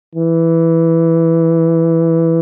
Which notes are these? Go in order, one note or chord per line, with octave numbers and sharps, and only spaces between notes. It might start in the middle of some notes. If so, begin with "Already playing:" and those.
E3